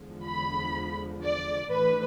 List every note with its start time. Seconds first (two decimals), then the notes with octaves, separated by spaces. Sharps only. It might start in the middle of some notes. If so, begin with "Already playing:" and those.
Already playing: E2 D3 F3 G#3
0.27 B5
1.24 D5
1.71 A2 E3 A3 D4 B4